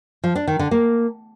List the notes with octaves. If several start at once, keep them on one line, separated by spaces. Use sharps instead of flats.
F3
D4
D#3
D3
A#3